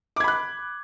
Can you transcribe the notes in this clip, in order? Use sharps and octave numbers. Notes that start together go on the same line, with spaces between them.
B5 D6 F#6 G#6